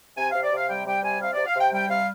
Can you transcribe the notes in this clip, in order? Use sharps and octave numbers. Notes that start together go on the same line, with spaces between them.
C3 G#5
C3 F5
D5
C3 F5
G3 G5
G3 G5
C3 G#5
C3 F5
C3 D5
F5
C3 G5
G3 G5
C3 F5